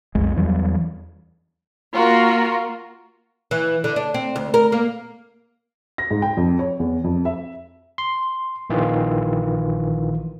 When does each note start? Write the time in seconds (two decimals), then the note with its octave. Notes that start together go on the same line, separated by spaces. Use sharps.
0.15 B1 F2 G#3
0.36 E2 E3 F#3 G3
1.94 A#3 F4 F#4 A#4
3.51 E3
3.84 D3
3.96 D4
4.14 C4
4.36 D2
4.54 A#4
4.72 A#3
5.98 A#6
6.11 G#2
6.22 G5
6.37 F2
6.59 C#5
6.80 E2
7.04 F2
7.25 E5
7.98 C6
8.70 A#1 D#3 E3 F4